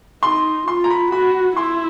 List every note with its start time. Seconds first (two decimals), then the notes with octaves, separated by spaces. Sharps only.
0.23 D#4 C6
0.67 F4 C6
0.84 A#5
0.90 B5
1.12 F#4 B5
1.56 E4 C6